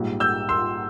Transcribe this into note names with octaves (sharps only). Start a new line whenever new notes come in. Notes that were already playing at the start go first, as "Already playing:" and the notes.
Already playing: A#1 G#2 G3
E6 G6
C6 E6